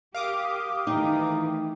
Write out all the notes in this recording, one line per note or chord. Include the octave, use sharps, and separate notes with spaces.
G4 A#4 F5 D6 D#6
D#3 E3 A3 D#4 G5 A#5